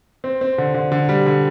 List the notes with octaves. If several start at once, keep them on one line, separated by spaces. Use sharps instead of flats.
C4
C4
D3
D3
D3
G3
D3